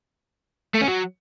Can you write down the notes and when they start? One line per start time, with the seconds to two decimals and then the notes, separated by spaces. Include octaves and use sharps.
0.74 A3
0.81 C#4
0.88 F#3